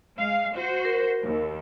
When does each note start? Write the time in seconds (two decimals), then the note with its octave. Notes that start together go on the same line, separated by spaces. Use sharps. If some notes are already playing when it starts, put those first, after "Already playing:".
0.19 G#3 F5
0.54 F#4 C5
0.85 A#4
1.23 D#2